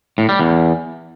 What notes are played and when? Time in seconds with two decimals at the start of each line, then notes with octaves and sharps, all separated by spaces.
0.18 A2
0.29 G3
0.40 E2